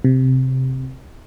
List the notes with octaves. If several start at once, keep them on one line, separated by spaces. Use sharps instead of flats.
C3